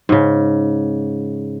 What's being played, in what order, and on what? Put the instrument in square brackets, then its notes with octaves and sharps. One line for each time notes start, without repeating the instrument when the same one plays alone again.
[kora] G#2 C#3